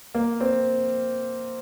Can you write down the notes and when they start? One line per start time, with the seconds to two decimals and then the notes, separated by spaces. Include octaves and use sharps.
0.15 A#3
0.40 C4